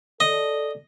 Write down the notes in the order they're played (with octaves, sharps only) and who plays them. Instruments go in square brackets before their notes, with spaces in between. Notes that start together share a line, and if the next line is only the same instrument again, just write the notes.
[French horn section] A4 D5 [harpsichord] D#5